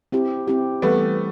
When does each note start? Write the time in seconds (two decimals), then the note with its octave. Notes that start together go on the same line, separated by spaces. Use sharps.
0.12 C4 E4 G4
0.48 C4 E4 G4
0.82 E3 G3 A3 B3